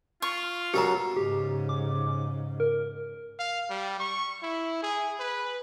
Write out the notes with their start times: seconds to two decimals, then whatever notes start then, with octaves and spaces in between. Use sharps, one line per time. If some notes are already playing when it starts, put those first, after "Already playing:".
0.22 F4 C#6
0.74 F#2 B2 F#3 G4 A#5
1.16 G#2 C#3 G4
1.69 D6
2.60 A#4
3.39 F5
3.70 G3
4.00 C#6
4.43 E4
4.83 G#4
5.20 B4